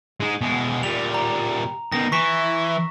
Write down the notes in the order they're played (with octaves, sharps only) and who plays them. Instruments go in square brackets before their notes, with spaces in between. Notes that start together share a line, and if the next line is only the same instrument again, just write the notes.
[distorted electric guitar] G#3 D#4
B2 G#3
[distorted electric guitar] A#2 G3 [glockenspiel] F7
[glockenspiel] A#5
[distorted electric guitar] B2 D#3 [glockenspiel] A#6
[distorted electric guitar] E3 [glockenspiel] C#6 B6 E7